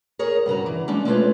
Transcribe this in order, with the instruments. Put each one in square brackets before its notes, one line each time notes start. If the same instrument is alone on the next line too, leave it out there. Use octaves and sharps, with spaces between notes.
[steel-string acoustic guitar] G#4 A#4 C#5
G2 C#3 F#4 A#5
E3
G3 G#3 C#4 D4
G#3 A3 C4 F4 B4 C#5